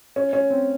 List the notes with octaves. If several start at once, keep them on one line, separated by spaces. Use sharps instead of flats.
C#4
C#4
C4